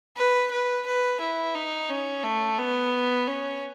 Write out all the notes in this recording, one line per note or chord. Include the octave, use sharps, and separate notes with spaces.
B4
B4
B4
E4
D#4
C#4
A3
B3
C#4